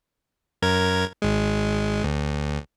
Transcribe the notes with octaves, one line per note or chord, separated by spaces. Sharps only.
F#2 A#4 G#6
G#1 G#3
D2